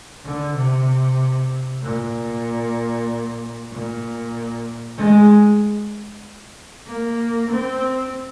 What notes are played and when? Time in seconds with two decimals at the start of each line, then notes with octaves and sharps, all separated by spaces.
0.24 D3
0.56 C3
1.83 A#2
3.71 A#2
4.97 G#3
6.87 A#3
7.51 C4